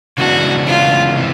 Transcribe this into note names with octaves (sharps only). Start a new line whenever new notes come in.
C#3 E3 G#3 B3 D4 F#4
F4
C3 E3